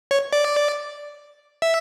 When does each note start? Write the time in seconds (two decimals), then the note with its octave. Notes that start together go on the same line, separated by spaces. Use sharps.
0.11 C#5
0.33 D5
1.62 E5